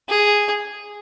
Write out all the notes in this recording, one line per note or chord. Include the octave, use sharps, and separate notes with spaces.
G#4